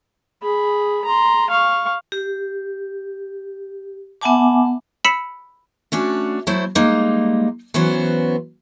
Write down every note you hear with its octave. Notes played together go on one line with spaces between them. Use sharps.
G#4 B5
A#5 C6
F5 C#6
G4
B3 E5 F#5 G#5 A5 D6
B5 E6 B6 C#7 E7
A3 C#4 D4 F#4
F#3 A3 E4 C5
G3 G#3 A#3 D#4
E3 F#3 B3 C#4 C5